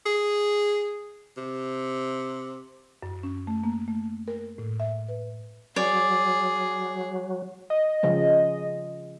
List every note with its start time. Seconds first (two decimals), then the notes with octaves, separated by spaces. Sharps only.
0.06 G#4
1.37 C3
3.03 F#2
3.23 C#4
3.47 A3
3.64 A#3
3.88 A3
4.28 A#4
4.58 A2
4.80 E5
5.08 B4
5.76 F#3 G#4 C#5 D5
7.70 D#5
8.03 C#3 F3 G#3